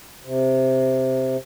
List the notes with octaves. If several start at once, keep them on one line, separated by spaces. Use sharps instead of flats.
C3